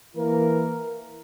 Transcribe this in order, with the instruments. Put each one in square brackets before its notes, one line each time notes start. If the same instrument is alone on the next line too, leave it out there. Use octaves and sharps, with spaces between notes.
[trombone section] E3 A#3 E4 A#4